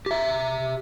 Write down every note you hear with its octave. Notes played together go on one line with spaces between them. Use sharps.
G4 E5